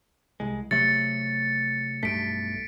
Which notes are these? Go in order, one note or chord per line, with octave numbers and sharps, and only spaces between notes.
C2 G#3
C3 F#3 A3 A6 C#7
B1 G2 A3 B6 D7